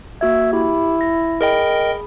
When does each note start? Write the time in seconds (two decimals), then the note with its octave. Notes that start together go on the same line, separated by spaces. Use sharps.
0.21 A#3 F#4 E5 G#6
0.53 E4 G4 B5
1.01 A#6
1.41 G#4 A#4 D#5 G5 B5